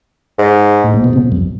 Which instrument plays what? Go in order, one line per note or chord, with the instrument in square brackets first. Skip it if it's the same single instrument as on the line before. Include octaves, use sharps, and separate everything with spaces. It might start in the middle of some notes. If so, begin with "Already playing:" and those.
[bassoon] G#2
[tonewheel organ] A2
A#2
B2
C3
F#2